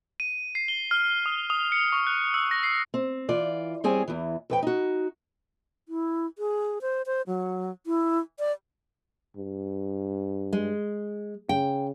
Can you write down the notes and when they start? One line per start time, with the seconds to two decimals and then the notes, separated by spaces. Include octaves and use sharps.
0.20 D#7
0.55 C7
0.68 G7
0.91 F6
1.26 D#6
1.50 D#6
1.72 C#7
1.92 C#6
2.07 F#6
2.34 E6
2.51 A#6
2.63 C7
2.94 C4
3.29 E3 F4 D5
3.84 G3 C4 G#4 C#5 G#5
4.08 E2 E3
4.50 F2 B4 G5
4.62 D#4 F#4
5.89 E4
6.38 G#4
6.82 C5
7.06 C5
7.27 F#3
7.87 E4
8.39 D5
9.37 G2
10.53 G#3
11.49 C#3 G5